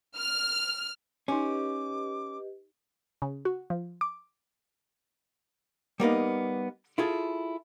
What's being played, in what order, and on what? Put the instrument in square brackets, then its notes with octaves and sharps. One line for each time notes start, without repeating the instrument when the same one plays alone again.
[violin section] F6
[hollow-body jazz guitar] C#4 [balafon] D#4 G#5 [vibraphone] G4 B4 D#5 [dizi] D6
[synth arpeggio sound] C#3
F#4
F3
D6
[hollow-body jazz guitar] G3 A#3 B3 D#4
E4 F4 G#4 A4